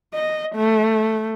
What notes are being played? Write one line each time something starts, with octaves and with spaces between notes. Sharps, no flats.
D#5
A3